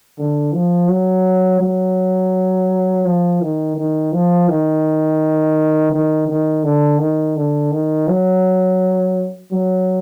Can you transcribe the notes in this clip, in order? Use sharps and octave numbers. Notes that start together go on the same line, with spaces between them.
D3
F3
F#3
F#3
F3
D#3
D#3
F3
D#3
D#3
D#3
D3
D#3
D3
D#3
F#3
F#3